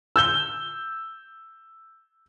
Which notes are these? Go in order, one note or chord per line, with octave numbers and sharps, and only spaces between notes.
E6 G6 G7